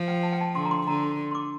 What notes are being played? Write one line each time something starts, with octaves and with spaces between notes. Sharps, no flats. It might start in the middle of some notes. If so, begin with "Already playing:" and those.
Already playing: F3
G5
A5
G5
A5
D3 C6
A#5
C6
D3 A#5
C6
C6
D6